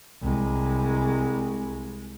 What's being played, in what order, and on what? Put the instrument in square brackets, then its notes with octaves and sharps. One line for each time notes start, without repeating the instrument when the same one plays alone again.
[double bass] C2 G#3